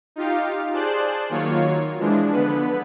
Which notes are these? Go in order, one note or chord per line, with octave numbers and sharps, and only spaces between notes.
D#4 F4 G4 F5
G#4 C5 D5 A5 C6 F#6
D#3 F#3 A#3 F4 C#5
E3 F3 G#3 D4
D3 B3 B4